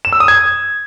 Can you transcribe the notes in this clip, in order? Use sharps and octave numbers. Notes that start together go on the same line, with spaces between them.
E7
E6
D#6
G#6